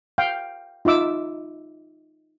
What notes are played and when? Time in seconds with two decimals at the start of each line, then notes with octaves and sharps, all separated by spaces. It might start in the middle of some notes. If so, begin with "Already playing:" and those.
0.18 F5 G5
0.85 D#4 F4 E5 D6 E6